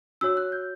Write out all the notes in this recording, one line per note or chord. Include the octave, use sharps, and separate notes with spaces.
D4 F#4 C#5 E6
F#6
G6